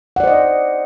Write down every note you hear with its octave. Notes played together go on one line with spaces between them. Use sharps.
C5 D5 D#5 F#5